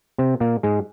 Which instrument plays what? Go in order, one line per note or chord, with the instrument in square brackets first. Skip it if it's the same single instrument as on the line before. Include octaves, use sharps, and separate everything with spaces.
[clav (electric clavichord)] C3 C4
A#2 A#3
G#2 G#3